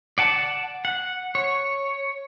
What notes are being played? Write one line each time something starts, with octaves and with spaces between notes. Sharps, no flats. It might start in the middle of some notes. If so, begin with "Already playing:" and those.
D5 F#5 A5
F#5
C#5